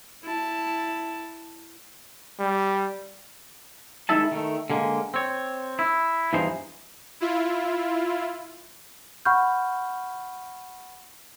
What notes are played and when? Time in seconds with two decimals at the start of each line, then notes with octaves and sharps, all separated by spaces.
0.23 E4 A5
2.40 G3
4.09 D#3 G#3 D#4 E4 E5 A5
4.32 D#3 A3
4.70 D3 G#3 A#3
5.14 C4 C#5
5.79 E4
6.33 E2 G2 E3 F3 D#4 C5
7.20 E4 F4
9.25 F#5 B5 C#6 F6 G6